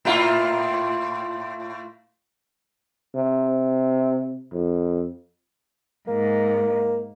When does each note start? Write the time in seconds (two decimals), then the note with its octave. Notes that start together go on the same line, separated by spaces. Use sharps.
0.05 A2 E4 F4
3.15 C3
4.52 F2
6.08 G#2 A#3